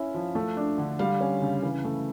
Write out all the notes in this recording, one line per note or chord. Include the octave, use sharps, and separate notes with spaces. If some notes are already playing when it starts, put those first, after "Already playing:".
Already playing: C#4 E4 E5
F3
A3
D4
D3
G3 F5
C#4
C#3
E3
A3